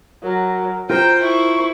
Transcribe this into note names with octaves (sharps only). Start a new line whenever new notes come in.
F#3 A#4
F4 A#4 C5 G5 A#5
E4 C#6